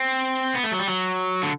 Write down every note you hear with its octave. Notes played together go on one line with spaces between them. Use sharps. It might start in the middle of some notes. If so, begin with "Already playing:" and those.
Already playing: C4
B3
A3
F#3
G3
F#3
D3